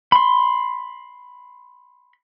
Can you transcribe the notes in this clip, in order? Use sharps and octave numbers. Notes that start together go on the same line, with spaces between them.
B5 C6